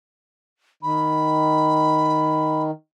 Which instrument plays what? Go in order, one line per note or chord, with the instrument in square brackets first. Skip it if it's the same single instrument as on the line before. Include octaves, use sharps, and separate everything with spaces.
[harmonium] D#3 [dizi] B5